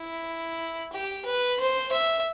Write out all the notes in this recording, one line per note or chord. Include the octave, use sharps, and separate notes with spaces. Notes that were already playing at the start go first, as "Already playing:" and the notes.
Already playing: E4
G4
B4
C5
E5